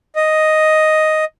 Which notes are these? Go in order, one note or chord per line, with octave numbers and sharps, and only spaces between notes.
D#5